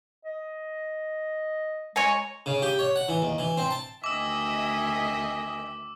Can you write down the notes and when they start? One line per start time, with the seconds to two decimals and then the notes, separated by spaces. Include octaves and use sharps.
0.25 D#5
1.96 G#3 C#5 G#5 A#5
2.46 C#3
2.62 G4
2.79 C#5
2.96 F#5
3.09 E3
3.22 D#2
3.38 E3
3.57 C4
3.71 A5
4.04 D2 D#3 D#5 E5 G5 G#5 D6 E6